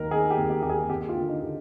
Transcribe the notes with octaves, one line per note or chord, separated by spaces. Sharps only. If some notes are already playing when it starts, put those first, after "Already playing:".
Already playing: D#2 D#3 A#4
D#3 G#4
G4
D#2
G4
D#2 G4
G#4
D#2 G4
F4
D3
D#4
D3